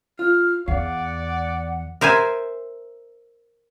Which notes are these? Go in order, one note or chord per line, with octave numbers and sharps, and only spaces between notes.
F4 F6
E2 D5 F5 F#5
A#4 C5 E5 G#5